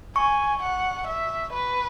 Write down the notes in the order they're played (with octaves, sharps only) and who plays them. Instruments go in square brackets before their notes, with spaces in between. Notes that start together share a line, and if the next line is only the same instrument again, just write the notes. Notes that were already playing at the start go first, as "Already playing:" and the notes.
[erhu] G#5 [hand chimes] C#6
[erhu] F#5
E5
B4